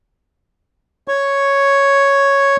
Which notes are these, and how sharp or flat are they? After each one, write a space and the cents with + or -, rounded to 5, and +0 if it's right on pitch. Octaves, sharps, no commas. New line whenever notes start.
C#5 +0 C#6 +0